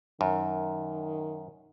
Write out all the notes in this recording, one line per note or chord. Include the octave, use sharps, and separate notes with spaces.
F#2 D#3